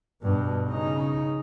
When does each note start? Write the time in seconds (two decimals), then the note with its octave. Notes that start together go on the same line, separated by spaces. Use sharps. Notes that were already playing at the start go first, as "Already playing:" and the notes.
0.22 G2 B2
0.68 C#3 D#4